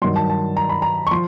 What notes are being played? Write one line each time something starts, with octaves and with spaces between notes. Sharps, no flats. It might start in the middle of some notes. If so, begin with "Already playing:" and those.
G2 D#3 F#3 C6
A5
A5
A#5
B5
A#5
C#6
F3 C6